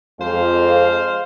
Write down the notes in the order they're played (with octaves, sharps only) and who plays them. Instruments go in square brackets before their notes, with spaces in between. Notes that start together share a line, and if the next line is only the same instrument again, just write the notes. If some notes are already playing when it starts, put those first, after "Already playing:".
[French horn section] F2 [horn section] G#3 C5 F5